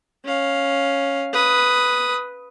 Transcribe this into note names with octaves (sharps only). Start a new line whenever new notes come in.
C#4 F5
B4 D#6